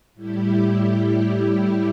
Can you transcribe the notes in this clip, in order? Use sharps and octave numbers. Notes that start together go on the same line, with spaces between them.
A2 G3 E4 G4